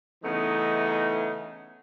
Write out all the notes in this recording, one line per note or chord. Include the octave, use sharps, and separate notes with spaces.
C#3 E3 A3 B3 D#4